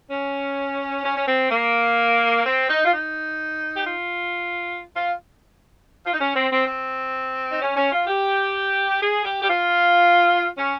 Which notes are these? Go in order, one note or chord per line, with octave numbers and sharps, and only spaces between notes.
C#4
C#4
C#4
C4
A#3
C4
D#4
F4
D#4
G4
F4
F4
F4
D#4
C#4
C4
C4
C4
D#4
C#4
C#4
F4
G4
G#4
G4
G4
F4
C#4